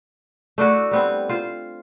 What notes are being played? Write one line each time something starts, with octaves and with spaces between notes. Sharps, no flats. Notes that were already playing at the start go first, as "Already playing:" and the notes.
A3 D4 E4 F#4
G3 B3 C4
F4 C5